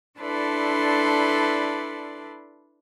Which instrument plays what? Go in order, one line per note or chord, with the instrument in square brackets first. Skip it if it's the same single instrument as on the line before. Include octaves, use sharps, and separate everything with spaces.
[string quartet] D4 E4 A4 B4 D5 C6